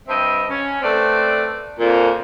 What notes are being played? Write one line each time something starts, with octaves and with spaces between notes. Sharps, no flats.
G2 C4 D#5 E5
C#4
A3 C4 B4 D5
F2 A#2